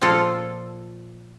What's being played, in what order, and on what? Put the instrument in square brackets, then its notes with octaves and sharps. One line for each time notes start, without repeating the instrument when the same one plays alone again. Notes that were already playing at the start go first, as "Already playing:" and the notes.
[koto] A#2 F3 F4 A4